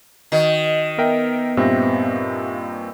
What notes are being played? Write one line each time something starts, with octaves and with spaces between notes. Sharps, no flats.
D#3 F#4 D#5
B3 A#4 E5 G5
G2 A#2 C4 G4 E5 A#6